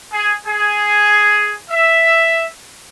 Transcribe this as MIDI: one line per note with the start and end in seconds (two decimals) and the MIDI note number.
0.13 0.33 68
0.47 1.54 68
1.71 2.44 76